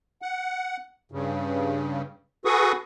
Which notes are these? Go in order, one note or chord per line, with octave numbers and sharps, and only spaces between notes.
F#5
G2 C#3
F#4 G#4 A4 B4 C#6 D#6